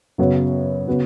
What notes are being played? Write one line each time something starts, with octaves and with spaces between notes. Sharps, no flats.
F#2 C#3 F#3 B3
C#3 B3 F#4